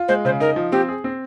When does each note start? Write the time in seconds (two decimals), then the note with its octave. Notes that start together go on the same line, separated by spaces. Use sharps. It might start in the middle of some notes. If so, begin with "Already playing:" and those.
Already playing: F4
0.08 G#3 C5
0.25 C#3 C5
0.40 D#4 A#4
0.56 F3
0.72 C4 G4
0.89 G#4
1.04 C4